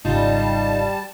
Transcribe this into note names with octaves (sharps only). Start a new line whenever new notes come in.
G#1 C#3 G3 D#4 F4 A5